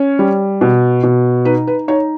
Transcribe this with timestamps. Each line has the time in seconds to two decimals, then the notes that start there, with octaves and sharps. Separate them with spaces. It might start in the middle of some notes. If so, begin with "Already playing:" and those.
Already playing: C#4 C#5
0.19 G3
0.61 B2
1.03 B2
1.45 D#4 B4
1.67 B4
1.88 D#4 C#5